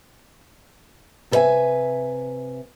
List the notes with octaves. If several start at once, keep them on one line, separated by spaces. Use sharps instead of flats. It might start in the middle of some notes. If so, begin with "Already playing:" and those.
C3 A4 B4 C#5 E5 G#5